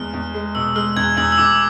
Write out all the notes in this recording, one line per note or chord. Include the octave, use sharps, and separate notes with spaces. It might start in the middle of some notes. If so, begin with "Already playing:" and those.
Already playing: E2 G#3 F6
E2
G#3
B2 E6
G#3 F6
E2 G#6
E2 E6
E6
E2 D6